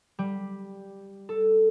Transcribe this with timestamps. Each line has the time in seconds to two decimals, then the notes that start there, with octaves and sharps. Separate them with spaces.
0.19 G3
1.29 A4